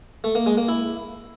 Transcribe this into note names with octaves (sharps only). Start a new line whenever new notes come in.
A3
A#3
G#3
A#3
E4